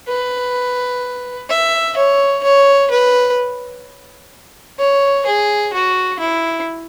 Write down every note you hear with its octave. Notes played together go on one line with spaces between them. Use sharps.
B4
E5
C#5
C#5
B4
C#5
G#4
F#4
E4